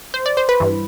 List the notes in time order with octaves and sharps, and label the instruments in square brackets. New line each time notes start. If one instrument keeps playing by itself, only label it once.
[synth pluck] C5
D5
C5
B4
G2 E3